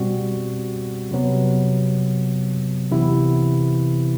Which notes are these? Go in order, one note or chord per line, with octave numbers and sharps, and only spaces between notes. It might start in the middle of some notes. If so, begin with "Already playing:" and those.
Already playing: B2 G3 C4 F#4
C3 F#3 B3
C3 E3 B3 E4